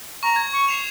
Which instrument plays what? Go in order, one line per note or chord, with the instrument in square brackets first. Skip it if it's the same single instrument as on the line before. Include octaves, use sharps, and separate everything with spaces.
[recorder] A#5 [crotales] C#6
[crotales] G#6
[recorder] C#6
[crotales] C7 E7 F7